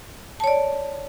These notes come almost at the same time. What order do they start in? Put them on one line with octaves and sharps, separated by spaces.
A5 C#5 D5